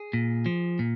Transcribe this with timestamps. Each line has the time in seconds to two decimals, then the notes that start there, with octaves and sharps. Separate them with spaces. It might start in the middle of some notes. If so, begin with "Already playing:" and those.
Already playing: G#4
0.13 A#2
0.46 F3
0.79 A#2